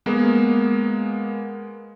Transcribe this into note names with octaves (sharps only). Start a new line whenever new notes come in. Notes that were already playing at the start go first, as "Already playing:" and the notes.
G#3 A#3 B3